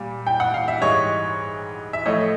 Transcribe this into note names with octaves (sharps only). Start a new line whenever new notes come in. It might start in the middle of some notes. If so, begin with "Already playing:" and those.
Already playing: A#2 G3
G5
F#5
F5
E5
G#2 E3 G3 C#5 D#5
E5
A2 F3 A3 C#5 D#5